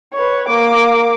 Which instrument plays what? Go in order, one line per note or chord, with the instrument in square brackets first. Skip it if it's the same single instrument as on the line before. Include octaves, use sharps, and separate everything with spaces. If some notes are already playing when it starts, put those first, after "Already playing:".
[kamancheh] B4 C#5
A#3 D6